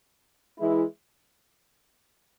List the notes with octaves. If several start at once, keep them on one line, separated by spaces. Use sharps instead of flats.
E3 G#3 E4